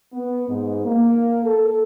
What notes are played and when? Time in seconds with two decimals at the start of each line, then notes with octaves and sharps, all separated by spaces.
0.13 B3
0.49 G#2
0.84 A#3
1.44 A4